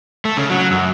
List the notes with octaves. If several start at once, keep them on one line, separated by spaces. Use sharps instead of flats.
A3
C#3
F#3
F#2